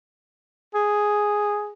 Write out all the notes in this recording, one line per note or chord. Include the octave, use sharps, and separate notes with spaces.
G#4